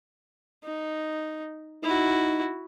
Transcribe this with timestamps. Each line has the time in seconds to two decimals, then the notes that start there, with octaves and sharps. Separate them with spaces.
0.64 D#4
1.83 D#4 E4 F#4